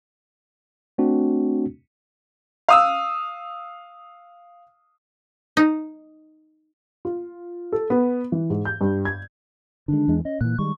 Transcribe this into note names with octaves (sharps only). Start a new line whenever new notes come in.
A3 C4 D4 F#4
F5 D#6 E6
D#4
F4
A4
B3
E3
G#2
G6
G2
G#6
D3 D#3 G#3 D4
E2 E3 G#3
C#4 D#5
A#2 E3 F#6
D#3 G3 G#3 C#6